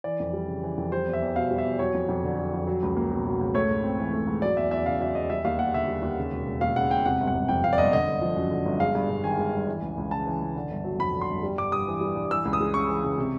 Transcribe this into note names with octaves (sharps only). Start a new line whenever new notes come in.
E3 D5
F2
G3
C#3
E3
F2
G3 C5
E2
E5
E2
B2 F5
G3
E5
E2
F#3 C#5
F2
F2
D3
F#3
F2
F#3
C#2
A#3
B2
F#3
C#2
A3 C#5
G#2
C4
E3
A3
G#2
F#3 D5
E2 E5
E2 E5
C#3 F5
F#3 E5
E2 D#5
G3 E5
D#2 F5
A#3 F#5
D3 E5
G3
D#2
C#3
E1
E1
D#2 F5
C#3 F#5
E1 G5
C3 F#5
G1
F#5
G1
F2 G5
C3 F5
D5
G1 D#5
D3 D#5
G1
F3
F#2
D3
G1
G#3 F5
G2
G2
D#3 G#5
G#3
G2
E3
C#2
C#2
C#3 A5
E3
C#2
D3
G1
F#3
F2 B5
D3
C6
G1
G3
G2 D6
G2 D#6
E3
G3
G2
E3 E6
C#2
D#6
G#3
C#3 C#6
E3
C#2
C3